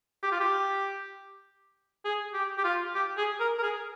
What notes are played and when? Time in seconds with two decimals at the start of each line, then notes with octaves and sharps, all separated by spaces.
0.23 G4
0.32 F4
0.40 G4
2.05 G#4
2.34 G4
2.58 G4
2.64 F4
2.94 G4
3.17 G#4
3.40 A#4
3.58 A#4
3.63 G#4